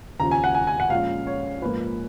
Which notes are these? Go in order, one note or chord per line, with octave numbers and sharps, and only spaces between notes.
D#2 C#3 F3 A#5
G#5
F#5
G#5
G#5
F#5
A#1 A#2 G#3 C#4 F5
C#5
A#1 G#2 F3 A#3 B4